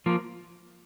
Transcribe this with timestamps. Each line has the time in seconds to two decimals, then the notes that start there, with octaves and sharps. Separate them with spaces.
0.06 F3 A#3